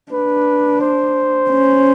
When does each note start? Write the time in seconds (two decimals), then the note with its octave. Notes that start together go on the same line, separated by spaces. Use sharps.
0.12 D4 B4
0.81 C5
1.49 C#4